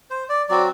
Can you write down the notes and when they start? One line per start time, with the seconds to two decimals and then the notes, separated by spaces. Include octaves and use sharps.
0.10 C5
0.29 D5
0.49 F#3 C4 F#4 D5